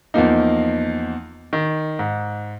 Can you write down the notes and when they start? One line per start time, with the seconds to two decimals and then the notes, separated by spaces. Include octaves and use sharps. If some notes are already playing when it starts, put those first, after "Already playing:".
0.14 E2 F3 A#3 D#4
1.53 D#3
1.99 G#2